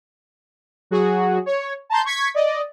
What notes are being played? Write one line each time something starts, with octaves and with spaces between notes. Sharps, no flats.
F#3 F#4 G#4
C#5
A5 A#5 C6 G6
C#6 G#6 B6
D5 D#5